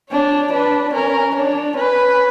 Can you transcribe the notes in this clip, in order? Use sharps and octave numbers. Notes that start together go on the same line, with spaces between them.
D4 C#5
D4 B4
C#4 A#4
D4 C#5
C#4 B4